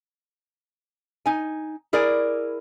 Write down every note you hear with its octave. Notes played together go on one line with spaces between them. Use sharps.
D#4 G#5
E4 G#4 A#4 D5